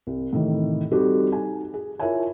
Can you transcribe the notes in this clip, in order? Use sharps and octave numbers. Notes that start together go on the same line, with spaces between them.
C2
A2 C3 D#3 E3
G3 C4 D#4 F#4 G4 A4
D#4 G#5
G#4
E4 F4 A#4 C#5 E5 G#5